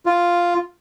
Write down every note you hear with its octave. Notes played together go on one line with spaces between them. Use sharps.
F4